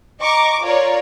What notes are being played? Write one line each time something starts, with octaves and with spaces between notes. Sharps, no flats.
D#5 A#5 C#6 D6
F4 A#4 C#5 D5